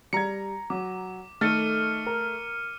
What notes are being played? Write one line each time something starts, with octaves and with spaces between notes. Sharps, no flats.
G3 A#5 G#6 C#7
F#3 D6
D#3 A3 A4 F6 A6 C#7 D#7
A#4